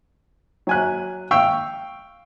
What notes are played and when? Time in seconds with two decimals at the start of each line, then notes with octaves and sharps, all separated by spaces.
0.67 F#3 G#5 F#6
1.31 F5 G5 C#6 E6